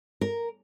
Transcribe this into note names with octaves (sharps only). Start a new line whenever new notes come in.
A#4